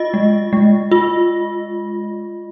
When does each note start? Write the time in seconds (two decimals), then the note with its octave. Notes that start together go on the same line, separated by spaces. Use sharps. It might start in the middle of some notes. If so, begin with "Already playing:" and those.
Already playing: F4 D#5
0.14 G#3
0.53 G#3
0.92 F4